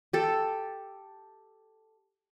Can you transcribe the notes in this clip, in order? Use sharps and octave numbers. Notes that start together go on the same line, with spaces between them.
G4 A4